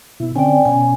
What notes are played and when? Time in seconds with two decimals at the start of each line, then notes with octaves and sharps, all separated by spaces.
0.20 B2 E4
0.36 D3 C4 C#4 D5 G5 G#5
0.65 B2 C#4 G#5